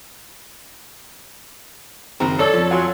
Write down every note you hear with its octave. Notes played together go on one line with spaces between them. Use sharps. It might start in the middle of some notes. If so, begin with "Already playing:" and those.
F#1 D#3 C4 A#5
A4 C#5 D5
F2 F3
F#3 F5 G#5 C6